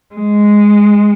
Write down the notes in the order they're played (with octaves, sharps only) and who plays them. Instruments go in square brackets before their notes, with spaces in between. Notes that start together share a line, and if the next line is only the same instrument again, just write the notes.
[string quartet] G#3